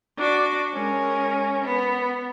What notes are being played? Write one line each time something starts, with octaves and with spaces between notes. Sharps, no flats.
D4 F#4 D6
G#3 C#4 A#4
B3